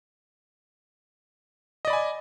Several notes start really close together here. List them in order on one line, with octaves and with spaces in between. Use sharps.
D#5 D5 B5 G#5